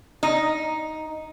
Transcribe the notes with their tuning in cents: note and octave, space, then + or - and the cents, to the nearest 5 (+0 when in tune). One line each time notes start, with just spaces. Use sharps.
D#4 +5